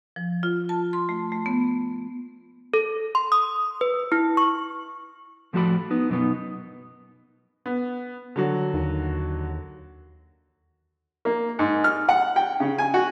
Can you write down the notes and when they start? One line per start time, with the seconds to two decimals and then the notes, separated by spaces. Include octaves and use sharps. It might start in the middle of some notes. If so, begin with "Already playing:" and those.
0.16 F3
0.43 F4
0.69 A5
0.93 C6
1.09 A3
1.32 A3
1.46 B3
2.74 A4
3.15 C6
3.32 D#6
3.81 B4
4.12 E4
4.37 C#6
5.53 A2 F3 A3 F#4 D5 B5
5.90 B3 D#4
6.10 F#2 B2 A3 B3 D#4
7.66 B3
8.36 D3 F#3 F#4
8.74 D#2
11.25 A#3
11.59 G#2
11.84 F6
12.09 F#5
12.36 G5
12.60 C#3
12.78 G#5
12.94 F#4